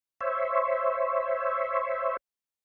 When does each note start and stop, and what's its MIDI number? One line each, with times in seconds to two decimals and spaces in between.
0.21 2.17 72
0.21 2.17 73
0.21 2.17 76